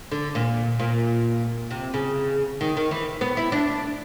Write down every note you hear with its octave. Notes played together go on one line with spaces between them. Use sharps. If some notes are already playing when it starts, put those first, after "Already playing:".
D3
A#2
A#2
C3
C#3
D#3
D#3
E3
B3
E4
D4